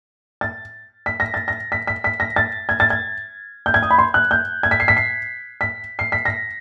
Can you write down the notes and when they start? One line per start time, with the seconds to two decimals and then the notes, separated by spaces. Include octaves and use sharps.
0.41 A6
1.06 B6
1.20 A#6
1.34 A6
1.48 A#6
1.72 B6
1.87 B6
2.04 B6
2.20 A#6
2.36 A6
2.69 G#6
2.80 A6
2.90 G#6
3.66 G6
3.74 G#6
3.83 D#6
3.91 B5
3.98 C6
4.14 F#6
4.31 G6
4.63 G#6
4.71 B6
4.80 C7
4.88 B6
4.97 C7
5.61 B6
5.99 C7
6.12 B6
6.25 A#6